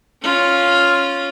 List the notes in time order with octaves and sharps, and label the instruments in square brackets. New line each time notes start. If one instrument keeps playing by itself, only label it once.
[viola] C#4 F4